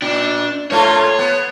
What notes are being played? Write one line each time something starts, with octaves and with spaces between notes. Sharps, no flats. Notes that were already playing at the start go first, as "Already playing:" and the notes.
A#2 D4
A#2 A3 F4 C#5
B3